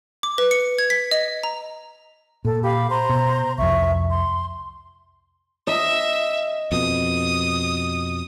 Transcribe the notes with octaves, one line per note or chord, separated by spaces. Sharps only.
D6
B4
C#7
G#6
B6
D#5
A#5
A#2 A4
G4 F5 B5
C5 A#5 C6
B2
C2 F2 E5 C#6
C6
D#5 E5
F2 B2 D#6